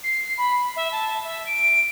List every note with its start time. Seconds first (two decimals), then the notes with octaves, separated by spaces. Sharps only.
0.04 C7
0.37 B5
0.76 E5
0.92 A5
1.24 E5
1.46 D7